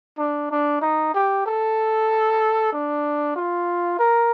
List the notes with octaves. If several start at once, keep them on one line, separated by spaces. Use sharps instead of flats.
D4
D4
D#4
G4
A4
D4
F4
A#4